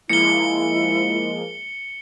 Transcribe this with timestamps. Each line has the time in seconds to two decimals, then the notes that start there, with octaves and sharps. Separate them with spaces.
0.09 F3 G#3 A#3 E4 C#7 G7